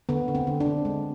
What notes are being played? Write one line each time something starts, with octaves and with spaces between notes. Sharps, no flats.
D3 B3
D3
C4
D3
D4
D3
G#3